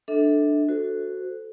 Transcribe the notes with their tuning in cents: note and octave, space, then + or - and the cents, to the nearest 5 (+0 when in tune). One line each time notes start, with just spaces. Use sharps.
D4 +10 A4 +0 E5 -35
F#4 +0 A4 +0 C5 -20